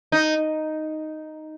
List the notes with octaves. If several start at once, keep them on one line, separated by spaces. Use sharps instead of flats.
D#4